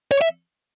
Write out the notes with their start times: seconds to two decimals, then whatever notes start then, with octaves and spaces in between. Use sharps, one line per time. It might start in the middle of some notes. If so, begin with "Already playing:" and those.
0.11 C#5
0.21 E5